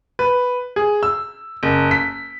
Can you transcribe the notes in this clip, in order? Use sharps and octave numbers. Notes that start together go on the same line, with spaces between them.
B4
G#4
E6
F#1
B6